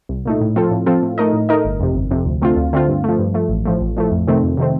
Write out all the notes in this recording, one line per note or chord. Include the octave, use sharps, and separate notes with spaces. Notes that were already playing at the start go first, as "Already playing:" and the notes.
C2
A#2 A3 D#4
A2
F3 C4 F4 A4
A2
F3 C4 F4 A4
A2
A3 D#4 A#4 D#5
A2
A3 D#4 A#4 D#5
G1
F2 C3
G1
F2 C3
D2
D3 A3 C4 F4
D2
D3 A3 C4 F4
G2
F3 A3
G2
F3 A3
A1
A2 F3 A3
A1
A2 F3 A3
F2
C3 D#3 A3 C4
F2
C3 D#3 A3 C4